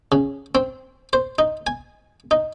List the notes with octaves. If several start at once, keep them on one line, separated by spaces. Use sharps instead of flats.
C#3
C4
C5
D#4
G#5
D#4